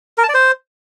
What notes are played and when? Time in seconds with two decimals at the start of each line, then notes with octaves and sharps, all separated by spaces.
0.18 A#4
0.23 A5
0.29 D5
0.34 C5